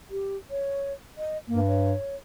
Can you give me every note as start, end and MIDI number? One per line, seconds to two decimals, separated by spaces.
0.11 0.37 67
0.51 0.93 73
1.18 1.37 75
1.48 1.95 43
1.48 1.60 58
1.68 2.16 73